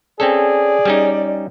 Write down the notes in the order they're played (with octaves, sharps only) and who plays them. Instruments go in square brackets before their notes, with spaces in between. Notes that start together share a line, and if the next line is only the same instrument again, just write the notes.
[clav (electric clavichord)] C4 C#4 A4 [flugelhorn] G#4 [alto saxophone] D5
[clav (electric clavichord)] G3 C#4 D#4